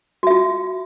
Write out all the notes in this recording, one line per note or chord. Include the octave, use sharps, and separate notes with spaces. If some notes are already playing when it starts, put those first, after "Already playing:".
F4 F#4 E5